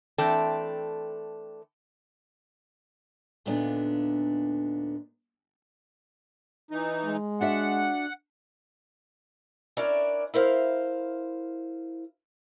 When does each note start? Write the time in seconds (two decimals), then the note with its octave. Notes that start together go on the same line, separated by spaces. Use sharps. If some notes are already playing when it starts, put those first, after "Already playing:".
0.18 E3 A3 C4 D4 A4 G5
3.46 D#2 A#2 D3 A3 B3 D4
6.71 E3 D#4
7.05 G#3
7.41 D4 F#4 E5 F#5
9.77 C#4 D4 E4 A#4 D5
10.34 E4 A#4 C5 F5